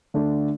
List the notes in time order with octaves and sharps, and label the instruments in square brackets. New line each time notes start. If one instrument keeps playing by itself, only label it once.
[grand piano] D3 A3 D4